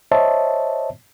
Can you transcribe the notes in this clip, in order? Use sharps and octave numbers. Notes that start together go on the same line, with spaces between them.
C5 C#5 D#5 E5 A5